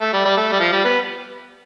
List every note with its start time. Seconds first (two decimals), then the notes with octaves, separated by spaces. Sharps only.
0.01 A3
0.13 G3
0.25 G3
0.37 A3
0.52 G3
0.60 F3
0.72 G3
0.84 B3